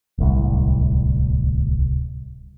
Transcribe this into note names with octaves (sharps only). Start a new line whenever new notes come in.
D1 C2